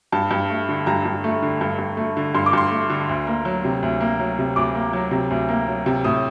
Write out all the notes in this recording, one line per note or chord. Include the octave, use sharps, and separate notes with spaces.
G2 A5
G2
A3
D3
G2 A#5
G2
A3
D3
G2
G2
A3
D3
G2 C6
D6
G2 C6
A3
D3
D2
A#3
F#3
C3
D2
A#3
F#3
C3
D2 D6
A#3
F#3
C3
D2
A#3
F#3
C3
A2 D#6